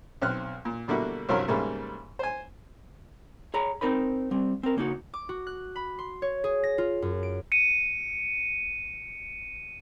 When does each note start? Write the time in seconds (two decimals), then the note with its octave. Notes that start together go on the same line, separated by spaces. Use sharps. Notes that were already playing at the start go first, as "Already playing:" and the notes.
0.22 B1 C4 F6 F#6
0.65 A#2
0.88 B2 D3 G3 A#3 E4 F#4
1.29 C2 G2 F3 F#3 A#4 F6
1.48 G#2 C#3 G3 A3 A#3
2.19 C5 G#5
3.54 G#4 C#5 A#5 B5
3.81 C4 D#4 A#4 C5 B5
4.31 G3 C4
4.63 C4 A#4
4.76 C#3 A#3 D#4 F#4
5.14 D6
5.29 F#4
5.47 F#6
5.76 B5
5.99 C6
6.22 C#5
6.44 G#4
6.64 A#6
6.78 F4
7.02 F#2
7.23 D7
7.52 C#7 D#7